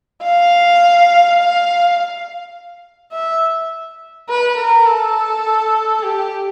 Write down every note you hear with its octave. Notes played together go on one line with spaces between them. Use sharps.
F5
F5
E5
B4
A#4
A4
G4